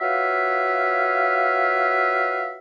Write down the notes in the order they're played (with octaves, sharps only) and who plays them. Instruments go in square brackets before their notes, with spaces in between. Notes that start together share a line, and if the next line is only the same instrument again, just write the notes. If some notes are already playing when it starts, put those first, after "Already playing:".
[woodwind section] F4 F#4 B4 C#5 E5 F5